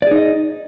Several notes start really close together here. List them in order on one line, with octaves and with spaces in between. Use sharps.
D5 G#4 D#4 D#5